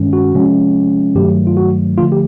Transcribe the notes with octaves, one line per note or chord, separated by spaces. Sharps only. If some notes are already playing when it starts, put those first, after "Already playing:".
Already playing: G2 D#3 G#3 C#4
F#4
C3 F3 G#3 C#4
G2 D#3 F#3 A3 G4
F4
F#4
D3 F3 A3 F4
G4